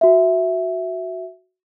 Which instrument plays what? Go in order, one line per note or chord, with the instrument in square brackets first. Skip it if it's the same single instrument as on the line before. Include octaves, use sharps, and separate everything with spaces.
[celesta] F#4 E5